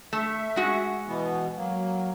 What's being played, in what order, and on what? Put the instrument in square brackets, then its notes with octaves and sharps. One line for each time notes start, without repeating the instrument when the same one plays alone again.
[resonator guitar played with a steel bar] A3 [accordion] E5
[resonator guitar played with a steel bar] G#3 F#4
[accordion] B2 E3 B3
F#3 A#3